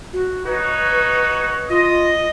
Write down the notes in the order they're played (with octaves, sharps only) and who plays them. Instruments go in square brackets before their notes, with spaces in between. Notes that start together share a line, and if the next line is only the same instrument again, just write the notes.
[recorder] F#4
[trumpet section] D#4 F#4 C#5 [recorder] B4
[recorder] F4 [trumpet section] D#5